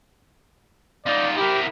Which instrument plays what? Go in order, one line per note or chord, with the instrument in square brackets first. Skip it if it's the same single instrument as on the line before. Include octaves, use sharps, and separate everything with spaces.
[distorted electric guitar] D#4 F4 [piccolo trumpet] D5
[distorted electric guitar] E4 A#4 [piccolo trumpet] G4